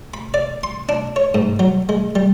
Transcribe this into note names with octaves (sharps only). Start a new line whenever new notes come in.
B5
D5
C6
D4
C#5
G#2
F#3
G#3
G3